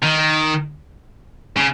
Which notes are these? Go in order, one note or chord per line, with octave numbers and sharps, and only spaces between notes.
D#3
C#3